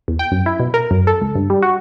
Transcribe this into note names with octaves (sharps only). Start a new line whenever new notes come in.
E2
G5
F#2
E4
B2
A#4
F#2
A4
C#2
G2
G3
F#4